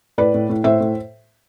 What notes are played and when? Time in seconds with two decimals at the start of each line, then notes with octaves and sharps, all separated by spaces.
0.18 A2 B4 D5
0.34 A2
0.49 A2
0.64 A2 C5 E5
0.80 A2